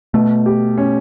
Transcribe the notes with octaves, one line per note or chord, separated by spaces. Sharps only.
B2 A3
G4
C#4